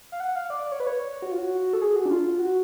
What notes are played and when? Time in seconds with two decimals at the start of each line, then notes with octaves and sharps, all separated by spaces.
0.12 F5
0.20 F#5
0.35 F5
0.50 D5
0.64 D5
0.72 C#5
0.80 B4
0.87 C#5
1.22 F#4
1.31 F4
1.39 F#4
1.73 A4
1.81 G#4
1.96 F#4
2.05 D4
2.11 F4
2.39 F#4